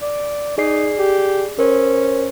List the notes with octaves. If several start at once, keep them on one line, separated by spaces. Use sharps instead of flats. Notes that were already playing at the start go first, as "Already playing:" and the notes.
D5
D#4 G#4 D5 C7
G4
C#4 A#4 C5